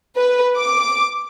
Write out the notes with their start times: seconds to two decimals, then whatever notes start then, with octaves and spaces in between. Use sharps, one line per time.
0.17 B4
0.57 D6